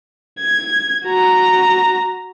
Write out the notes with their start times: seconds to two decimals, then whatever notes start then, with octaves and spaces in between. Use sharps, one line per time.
0.40 G#6
1.06 F#4 A#5